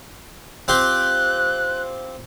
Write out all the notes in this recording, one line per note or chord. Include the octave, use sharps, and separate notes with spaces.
C4 F4 G4 F#6